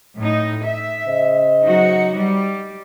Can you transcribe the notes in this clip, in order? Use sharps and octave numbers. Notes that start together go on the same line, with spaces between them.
A2 D#4
E5
C#3 C5 D#5
F#3 D#4 F#4
G3